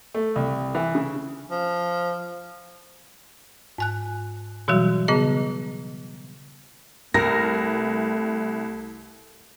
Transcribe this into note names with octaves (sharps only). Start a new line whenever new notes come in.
A3
C2
E3
C#3
F3
G#2 G#5 F#6
B2 E3 F#3 G3 F#4
C#3 B3 G#4 D#5 A#5
C2 A3 A#4 A#6